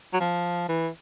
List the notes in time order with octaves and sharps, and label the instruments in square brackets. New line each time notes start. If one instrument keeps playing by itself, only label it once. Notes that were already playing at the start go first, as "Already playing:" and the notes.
[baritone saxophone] F#3
F3
E3